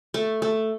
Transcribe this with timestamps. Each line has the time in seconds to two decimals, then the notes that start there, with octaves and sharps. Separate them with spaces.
0.14 A3
0.42 A3